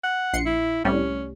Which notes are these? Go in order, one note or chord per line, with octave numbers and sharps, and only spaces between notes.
F#5
A#1 C6 C#7
E4
C2 A2 G3 C#4